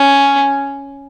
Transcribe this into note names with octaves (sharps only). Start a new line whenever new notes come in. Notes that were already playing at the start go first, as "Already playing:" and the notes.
Already playing: C#4